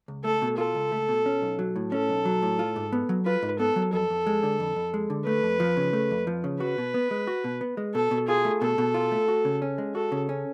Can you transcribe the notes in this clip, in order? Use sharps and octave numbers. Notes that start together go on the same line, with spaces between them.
C#2
A3 A4
B2
F4 A4
C#2
A3
B2
C#4
B1
F#3
A2
C#4 A4
B1
F#3
A2
F4
G#2
B3
F#3
F4 B4
G#2
B3 A4
F#3
F2 A4
F2
G#3
D3
F2
F2
G#3
D3
A3 B4
F2
F3
C#3
A3
F2
F3
C#3
F#4 B4
B2
B3
G#3
F#4
B2
B3
G#3
B2 A4
B2
F4 G#4
A3
B2 A4
B2
F4
A3
F#4
C#3
C#4
G#3
F#4 A4
C#3
C#4